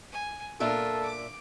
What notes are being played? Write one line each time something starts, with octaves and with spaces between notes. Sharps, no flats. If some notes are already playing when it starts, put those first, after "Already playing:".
G#5
A#2 D4 F4 A4 A#4 E5
D6